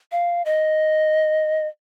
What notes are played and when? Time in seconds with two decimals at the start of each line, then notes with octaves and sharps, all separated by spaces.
0.12 F5
0.45 D#5